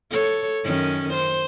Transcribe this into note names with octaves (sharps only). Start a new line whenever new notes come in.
A4 C#5
F#2 D#3 C#4
C5